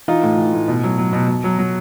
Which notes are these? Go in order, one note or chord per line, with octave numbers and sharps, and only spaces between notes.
E3 D#4 F4
A2
E3
A2
B2
F#3
F#3
B2
B2
F#3
F#3